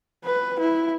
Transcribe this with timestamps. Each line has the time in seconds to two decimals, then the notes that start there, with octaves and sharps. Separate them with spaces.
0.24 B4
0.60 E4